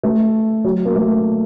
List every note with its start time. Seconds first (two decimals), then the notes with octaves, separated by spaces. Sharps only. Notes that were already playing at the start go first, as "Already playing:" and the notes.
0.03 A3
0.64 F#3
0.85 A#3
0.95 A3